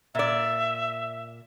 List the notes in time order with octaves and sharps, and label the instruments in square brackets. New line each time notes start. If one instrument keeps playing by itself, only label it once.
[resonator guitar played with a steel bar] A#2 D5 [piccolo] E5